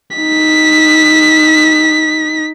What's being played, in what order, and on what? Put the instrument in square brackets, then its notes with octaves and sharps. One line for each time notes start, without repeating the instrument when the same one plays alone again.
[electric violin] D#4 B6